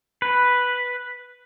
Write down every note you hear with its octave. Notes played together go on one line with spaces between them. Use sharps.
B4